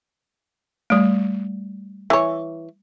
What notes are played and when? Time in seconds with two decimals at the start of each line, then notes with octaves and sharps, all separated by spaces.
0.90 G3 A3
2.10 E3 C#5